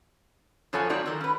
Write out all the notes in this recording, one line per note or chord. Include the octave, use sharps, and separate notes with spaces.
F#2 F3 A4 C#5 F#5 G#5
A3 C4 D#4 F#4 C#5 D5
D#3 F#3 A4 A#4
C#4 B4